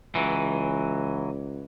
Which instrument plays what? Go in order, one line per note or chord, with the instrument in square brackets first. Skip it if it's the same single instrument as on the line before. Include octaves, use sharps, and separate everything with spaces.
[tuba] C#2 [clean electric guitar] E3 F#3